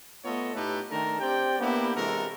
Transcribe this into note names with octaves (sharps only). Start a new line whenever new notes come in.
A3 B3 F4 A4 C#5 D#5
A2 A3 D#4 G4 A4 B4
D#3 A3 D4 A4 A#4
C4 G4 C5 D5 G5
A#3 B3 D4 E4 G4
C3 E3 G#3 F#4 A4 A#4